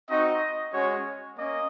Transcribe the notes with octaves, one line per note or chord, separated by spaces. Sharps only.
C4 D#4 F#4 D#5
G#3 C#4 F#4 C#5
A#3 C#4 D#5